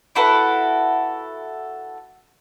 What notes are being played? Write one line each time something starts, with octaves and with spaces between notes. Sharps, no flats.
E4 F#4 A4 B4